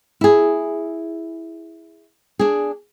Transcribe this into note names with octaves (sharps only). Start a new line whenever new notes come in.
E4 G#4
D4 G#4